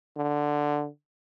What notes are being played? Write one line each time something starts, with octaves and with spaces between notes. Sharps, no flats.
D3